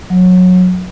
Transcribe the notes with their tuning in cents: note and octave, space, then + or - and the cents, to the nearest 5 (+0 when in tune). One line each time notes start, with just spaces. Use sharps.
F#3 -20